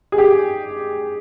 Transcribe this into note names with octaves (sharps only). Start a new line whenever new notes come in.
G#4
G4